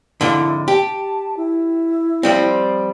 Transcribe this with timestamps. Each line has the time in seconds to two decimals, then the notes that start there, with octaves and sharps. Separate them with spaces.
0.21 F2 G#2 D3 E4
0.68 G4 A5
1.37 E4
2.23 F3 G3 C4